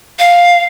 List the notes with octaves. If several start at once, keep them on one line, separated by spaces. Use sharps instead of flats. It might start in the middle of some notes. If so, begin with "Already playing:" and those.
F5